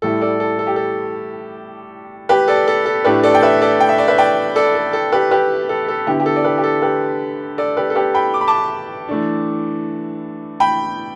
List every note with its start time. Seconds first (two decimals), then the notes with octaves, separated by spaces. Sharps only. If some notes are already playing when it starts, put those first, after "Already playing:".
0.02 A2 G3 E4 A4
0.22 A4 D5
0.40 A4
0.59 A4
0.67 G4
0.76 A4
2.29 G4 B4
2.48 A4 D5
2.68 A4
2.86 A4
3.05 A2 A3 D4 G4 B4
3.23 A4 D5
3.34 G5
3.42 B4 E5
3.62 A4 D5
3.80 G5
3.89 E5
3.98 D5
4.08 B4 E5
4.18 D5 G5
4.56 A4 D5
4.75 A4
4.93 A4
5.12 G4 B4
5.31 G4 B4
5.69 A4
5.88 A4
6.07 D3 B3 E4 G4
6.20 G4
6.26 A4
6.36 D5
6.44 G4 B4
6.58 G4
6.64 A4
6.82 G4 B4
7.58 A4 D5
7.77 G4 B4
7.90 A4
7.95 G4 B4
8.14 G5 B5
8.34 D6
8.41 B5
8.48 A5 D6
9.09 E3 A3 D4
10.60 G5 B5